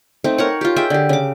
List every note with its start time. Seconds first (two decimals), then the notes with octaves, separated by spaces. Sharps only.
0.24 A3 C4 D#4
0.38 A#4 C#5 F#5
0.61 F4 G4
0.76 G#4 D#5 E5 G5
0.90 D3 G4
1.09 C#3 D6